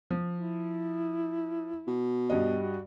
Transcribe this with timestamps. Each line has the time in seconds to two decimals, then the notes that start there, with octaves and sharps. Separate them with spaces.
0.10 F3
0.38 E4
1.87 B2
2.30 G2 G3 F#4 D#5
2.62 F#4